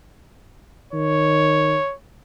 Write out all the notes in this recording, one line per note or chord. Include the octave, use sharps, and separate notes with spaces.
D#3 C#5